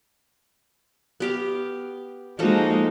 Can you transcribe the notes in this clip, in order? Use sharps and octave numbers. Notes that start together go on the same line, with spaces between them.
B3 G4 F5
F3 G#3 A#3 D#4 F#4 A4